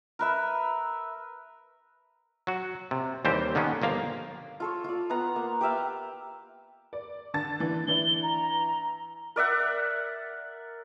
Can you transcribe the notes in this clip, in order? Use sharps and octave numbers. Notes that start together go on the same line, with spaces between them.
A#4 B4 E5
F#3 F#4
C3
D#2 E3 G3 C4 G4 C5
D3 D#3 A#3 B3 C#4
G1 F3 A#3 F5
F4 A4 C#5
F4 D5
B3 F4 F#5 A#5
A#3
G4 B4 E5 F5
D5
D3 A5 A6
D3 E3
E3 D4 E4 G7
A#5
A#4 D5 E5 F#5